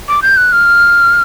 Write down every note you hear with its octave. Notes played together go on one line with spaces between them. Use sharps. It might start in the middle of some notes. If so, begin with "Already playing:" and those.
D6
G6
F#6
F6